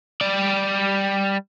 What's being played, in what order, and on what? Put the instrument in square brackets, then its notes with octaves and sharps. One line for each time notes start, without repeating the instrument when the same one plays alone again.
[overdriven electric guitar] G3 D5